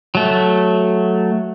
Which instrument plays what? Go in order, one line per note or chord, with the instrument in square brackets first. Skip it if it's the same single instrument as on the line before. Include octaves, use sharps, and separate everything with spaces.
[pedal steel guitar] F#3 A3